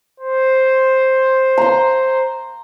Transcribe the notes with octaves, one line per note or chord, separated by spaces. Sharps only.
C5
A#5 C6